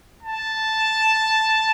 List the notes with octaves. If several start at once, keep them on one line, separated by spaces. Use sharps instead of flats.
A5